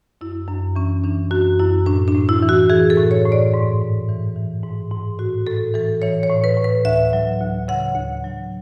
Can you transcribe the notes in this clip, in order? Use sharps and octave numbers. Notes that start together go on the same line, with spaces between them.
F#2 E4
F#2 D4
E3 C#4
E3 D4
F#2 F#4
F#2 E4
A2 D4
D4
A2
E4
E3
F#4
E3 G#4
A4
A2
C#5
A2
D5
G#2
G#2
E3
E3
G#2
G#2
A2 F#4
A2 A4
E3 A4
E3 C#5
C#5
A2
B4
A2
B4
D2 E5
F#3
D2
C#3 F#5
D2
F#3